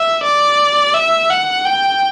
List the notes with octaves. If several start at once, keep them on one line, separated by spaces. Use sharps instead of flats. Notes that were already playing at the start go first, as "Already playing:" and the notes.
Already playing: E5
D5
E5
F#5
G5